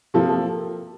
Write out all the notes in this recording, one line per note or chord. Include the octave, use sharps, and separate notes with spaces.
C3 F3 A#3 A4
A4